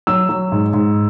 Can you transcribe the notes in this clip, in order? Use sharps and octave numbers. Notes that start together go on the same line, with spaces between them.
F#3 E6
F#3
G#2
G#2